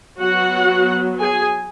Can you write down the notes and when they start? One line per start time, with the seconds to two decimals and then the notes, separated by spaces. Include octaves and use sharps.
0.19 F#3 B3 F#4 F#5
1.20 G#4 G#5